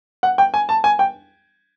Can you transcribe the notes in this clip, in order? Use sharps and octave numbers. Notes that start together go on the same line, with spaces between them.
F#5
G5
G#5
A5
G#5
G5